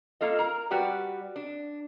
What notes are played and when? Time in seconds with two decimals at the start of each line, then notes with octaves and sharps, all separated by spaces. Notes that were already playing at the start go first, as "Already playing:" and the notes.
0.21 A#3 F4 A4 D#5
0.39 A#4 A#5
0.71 G3 F#4 G4 B4 D5
1.36 D4